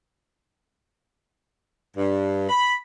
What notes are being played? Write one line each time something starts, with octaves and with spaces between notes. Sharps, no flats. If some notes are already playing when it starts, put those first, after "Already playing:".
G2
B5